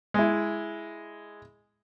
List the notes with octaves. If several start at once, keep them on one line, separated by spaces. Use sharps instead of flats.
G#3 E4